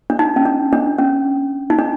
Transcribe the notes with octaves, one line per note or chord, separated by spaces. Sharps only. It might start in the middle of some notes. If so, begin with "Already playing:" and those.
D4
D#4
C#4
D4
D4
C#4
D#4
D4